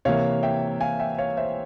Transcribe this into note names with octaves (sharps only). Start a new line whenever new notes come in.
C3 E3 A#3 C#5 F5
E5 G5
F5 G#5
E5 G5
C#5 F5
C5 E5